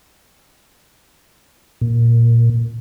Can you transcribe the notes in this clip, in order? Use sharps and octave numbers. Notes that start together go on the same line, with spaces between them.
A#2